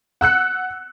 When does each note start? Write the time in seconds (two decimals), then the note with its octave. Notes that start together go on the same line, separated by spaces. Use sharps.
0.21 F#5 E6 F#6 C#7